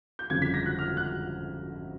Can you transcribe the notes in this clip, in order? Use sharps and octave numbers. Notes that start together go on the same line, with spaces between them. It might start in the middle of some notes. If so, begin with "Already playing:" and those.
G6
G1 F2 C#3 G#6
B6
A#6
F#6
F6
F#6